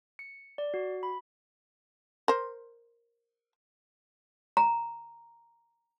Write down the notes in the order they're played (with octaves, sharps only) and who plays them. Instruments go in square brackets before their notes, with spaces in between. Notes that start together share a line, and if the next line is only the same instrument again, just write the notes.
[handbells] C#7
D5
F#4
B5
[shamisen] A#4 C5
[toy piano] A#5